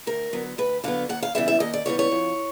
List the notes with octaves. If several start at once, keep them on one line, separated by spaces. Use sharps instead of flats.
D2 A#4
D3 F#3 B3
D2 B4
D3 F#3 B3 F5
D#2 F#5
F5
C#3 E3 G3 B3 E5
E5
D#2 D#5
D5
C#3 E3 G3 B3 C#5
C#5
F2